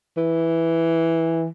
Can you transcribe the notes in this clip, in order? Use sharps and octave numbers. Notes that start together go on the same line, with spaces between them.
E3